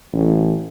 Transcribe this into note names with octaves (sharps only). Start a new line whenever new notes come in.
A1